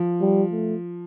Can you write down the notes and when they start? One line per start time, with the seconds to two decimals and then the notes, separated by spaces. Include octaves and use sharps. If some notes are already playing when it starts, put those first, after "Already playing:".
Already playing: F3
0.21 G3
0.52 A3